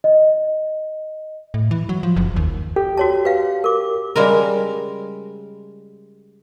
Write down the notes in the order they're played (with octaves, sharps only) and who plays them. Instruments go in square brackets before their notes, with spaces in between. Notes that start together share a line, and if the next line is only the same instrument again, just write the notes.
[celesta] D#5
[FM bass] A2
E3
F#3
F3
F#1
D#2
[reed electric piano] G4 [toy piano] A4
[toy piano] F#4 C#5 A5
B4 F5 G5
A#4 D6
[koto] C#3 G3 G#3 A#4